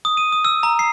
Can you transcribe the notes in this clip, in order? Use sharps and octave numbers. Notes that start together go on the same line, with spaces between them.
D#6
D#7
D#6
E6
A#5
C7